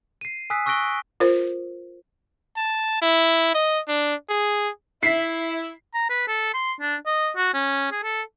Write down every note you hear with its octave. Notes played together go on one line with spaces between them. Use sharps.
C7 D#7
G#5 D#6 E6 F#6 B6
C#6 E6 F#6 A#6 D7 G7
F4 A#4 C5
A5
E4
D#5
D4
G#4
E4 E5 B6 C7
A#5
B4
A4
C6
D4
D#5
F#4
C#4
G#4
A4